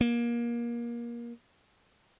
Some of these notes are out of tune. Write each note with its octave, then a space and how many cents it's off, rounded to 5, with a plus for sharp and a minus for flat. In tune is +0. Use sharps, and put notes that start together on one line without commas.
A#3 +25